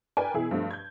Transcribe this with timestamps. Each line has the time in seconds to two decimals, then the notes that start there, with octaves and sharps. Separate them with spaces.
0.17 A#4 B4 D5 G5 G#5
0.34 B2 E3 E4 G#4
0.51 G2 F3 A3
0.71 G6 G#6